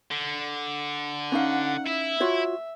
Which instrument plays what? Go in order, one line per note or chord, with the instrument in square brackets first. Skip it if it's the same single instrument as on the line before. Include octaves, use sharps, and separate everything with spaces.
[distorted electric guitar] D3
[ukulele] C#4 D#4 F5 [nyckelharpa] F#5
[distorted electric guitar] E4 [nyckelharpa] E5
[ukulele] F4 F#4 C#5